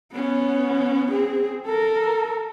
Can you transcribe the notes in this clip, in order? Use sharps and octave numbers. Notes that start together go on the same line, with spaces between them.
B3 C#4
C4 G#4
A4 A#4